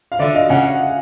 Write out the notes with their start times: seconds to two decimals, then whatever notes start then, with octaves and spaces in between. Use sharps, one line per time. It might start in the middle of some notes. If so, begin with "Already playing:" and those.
0.12 F5
0.19 D3 D5 E5
0.35 D#5 F5
0.49 C#3 F#5 G#5